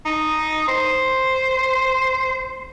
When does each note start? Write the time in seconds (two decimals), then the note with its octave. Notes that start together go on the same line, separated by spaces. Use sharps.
0.05 D#4
0.68 C5